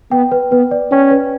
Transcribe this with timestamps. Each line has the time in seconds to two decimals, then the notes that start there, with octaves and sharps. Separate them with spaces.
0.12 B3 G5
0.32 B4
0.52 B3 B4
0.71 D5
0.92 C#4 G5
1.11 B4